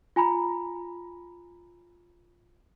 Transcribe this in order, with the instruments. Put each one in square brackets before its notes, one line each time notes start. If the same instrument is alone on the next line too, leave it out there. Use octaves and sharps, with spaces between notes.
[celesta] F4 G#5 A#5 B5